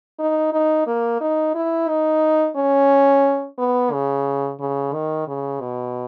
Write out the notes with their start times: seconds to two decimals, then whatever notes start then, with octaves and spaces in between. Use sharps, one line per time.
0.19 D#4
0.53 D#4
0.87 A#3
1.21 D#4
1.55 E4
1.88 D#4
2.56 C#4
3.58 B3
3.92 C#3
4.59 C#3
4.93 D#3
5.27 C#3
5.60 B2